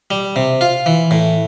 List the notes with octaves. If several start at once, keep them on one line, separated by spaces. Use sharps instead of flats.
G3
C3
F4
E3
A2